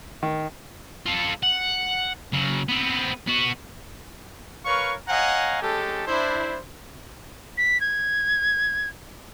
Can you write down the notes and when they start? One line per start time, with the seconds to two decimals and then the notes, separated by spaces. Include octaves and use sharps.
0.23 D#3
1.06 F4 A4
1.43 F#5
2.33 C#3 F#3
2.68 B3 C4
3.27 B3 F#4
4.65 A#4 B4 C#5 F5 C#6
5.08 C#5 D#5 F5 F#5 G#5 A#5
5.62 G#3 C#4 G4 A4
6.07 D4 E4 C5
7.58 B6
7.81 G#6